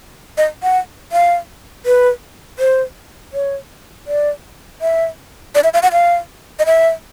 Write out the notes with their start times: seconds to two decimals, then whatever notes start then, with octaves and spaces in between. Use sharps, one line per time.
0.38 D#5
0.63 F#5
1.12 F5
1.86 B4
2.59 C5
3.33 C#5
4.07 D5
4.81 E5
5.55 D5
5.64 E5
5.74 F5
5.83 F#5
5.92 F5
6.59 D#5
6.66 E5